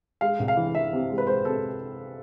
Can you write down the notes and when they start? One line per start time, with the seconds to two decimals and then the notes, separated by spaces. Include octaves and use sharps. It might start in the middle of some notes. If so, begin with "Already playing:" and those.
0.21 G#3 F5
0.40 C2
0.48 F5
0.57 E3
0.75 E3 E5
0.93 C3
1.10 G#3
1.18 B4
1.27 G#3 C5
1.45 C3 A4